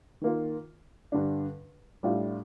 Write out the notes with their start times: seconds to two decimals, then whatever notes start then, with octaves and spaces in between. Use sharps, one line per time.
0.21 D#3 A#3 F4
1.12 G2 D3 G3 D4
2.03 A2 G3 D4 F4